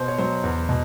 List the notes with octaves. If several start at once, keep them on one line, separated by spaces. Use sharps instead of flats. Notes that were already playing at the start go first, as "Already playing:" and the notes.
Already playing: B2 C5
C#5
F#3 C5
E2
B2